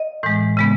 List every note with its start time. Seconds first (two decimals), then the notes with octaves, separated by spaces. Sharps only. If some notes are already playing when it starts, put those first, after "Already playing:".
Already playing: D#5
0.23 A2 E3 G#3
0.57 C#3 G#3 B3